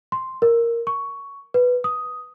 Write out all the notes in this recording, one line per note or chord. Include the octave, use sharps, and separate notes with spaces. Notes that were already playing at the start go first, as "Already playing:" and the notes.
C6
A#4
C#6
B4
D#6